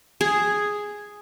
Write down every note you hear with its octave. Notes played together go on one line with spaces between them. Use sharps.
G#4